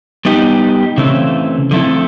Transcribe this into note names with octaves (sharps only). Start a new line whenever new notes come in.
G3 B3 D#4 G4
C#3 E3 A3 C4
D3 F3 A3 C4 E4